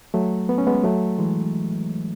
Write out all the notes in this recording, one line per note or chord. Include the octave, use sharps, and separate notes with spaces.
F#3 A3
B3
C#4
G#3 B3
F#3 A3
E3 G#3